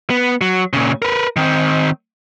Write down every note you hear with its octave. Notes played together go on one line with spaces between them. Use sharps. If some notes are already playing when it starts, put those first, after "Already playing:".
B3
F#3
A#2 C#3
A#4 B4
D#3 C4